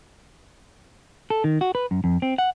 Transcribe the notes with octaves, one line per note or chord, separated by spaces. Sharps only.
A4
D#3
F#4
B4
F#2
F2
C4
F#5